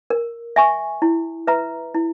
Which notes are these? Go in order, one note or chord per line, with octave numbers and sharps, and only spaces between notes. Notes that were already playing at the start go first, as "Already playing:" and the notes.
A#4
E5 G#5 C#6
E4
B4 E5 A#5
E4